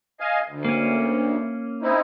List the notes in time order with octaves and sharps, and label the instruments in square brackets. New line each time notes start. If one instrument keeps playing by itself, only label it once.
[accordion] D#5 F5 G#5
D2
[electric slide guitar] A#3 C#4
[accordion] C4 D#4 E4